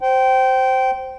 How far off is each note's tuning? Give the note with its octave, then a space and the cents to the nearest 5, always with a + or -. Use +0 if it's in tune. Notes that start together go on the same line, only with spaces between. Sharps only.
C5 +0 G5 -20